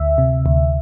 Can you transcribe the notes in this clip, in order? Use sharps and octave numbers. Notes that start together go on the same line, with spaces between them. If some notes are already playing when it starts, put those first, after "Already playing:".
Already playing: D2 E5
C3
D2